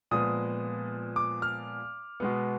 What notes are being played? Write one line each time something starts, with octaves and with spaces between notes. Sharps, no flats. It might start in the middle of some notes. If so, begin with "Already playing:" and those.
A#2 F3 G#3 B3 D#6
D6
F6
B2 G#3 B3